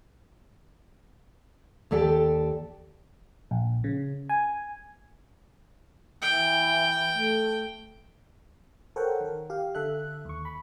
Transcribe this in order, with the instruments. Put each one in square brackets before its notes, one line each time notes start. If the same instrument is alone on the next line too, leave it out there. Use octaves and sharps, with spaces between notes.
[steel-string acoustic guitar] D#2 G4 A4 D5 G5 A5
[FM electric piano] A#1
C#3
G#5
[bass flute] E3 [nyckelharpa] G5
[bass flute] A3
[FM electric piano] A4 A#4 C5 C#5 F#5 G5
D#3 A#4
G4 F5
D3 A4 E5 F#6
D#2 C#6
B5